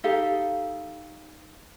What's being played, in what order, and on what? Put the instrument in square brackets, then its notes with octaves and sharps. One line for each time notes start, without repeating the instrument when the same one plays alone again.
[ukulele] D#4 G4 A4 F5